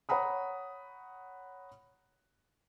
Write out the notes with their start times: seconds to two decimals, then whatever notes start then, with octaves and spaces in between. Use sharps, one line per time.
0.09 C#5 F#5 A#5 B5 D#6